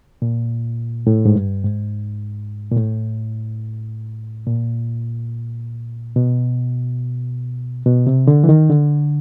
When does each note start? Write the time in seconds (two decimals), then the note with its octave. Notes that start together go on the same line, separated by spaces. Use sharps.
0.22 A#2
1.07 A2
1.25 G#2
1.35 G2
1.64 G#2
2.71 A#2
2.76 A2
4.46 A#2
6.16 B2
7.86 B2
8.07 C3
8.27 D3
8.44 E3
8.49 D#3
8.70 D3